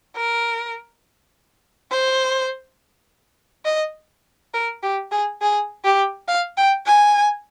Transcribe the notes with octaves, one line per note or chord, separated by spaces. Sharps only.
A#4
C5
D#5
A#4
G4
G#4
G#4
G4
F5
G5
G#5